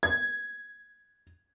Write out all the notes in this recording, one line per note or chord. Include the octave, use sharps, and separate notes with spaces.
G#6